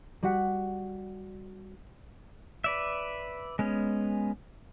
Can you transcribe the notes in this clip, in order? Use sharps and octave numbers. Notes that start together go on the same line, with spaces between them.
G3 F#4 F#5 B6
B4 D5 E5
G#3 B3 C#4